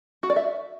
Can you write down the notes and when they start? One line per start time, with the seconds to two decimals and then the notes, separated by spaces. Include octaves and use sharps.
0.23 F#4
0.30 D5
0.36 E5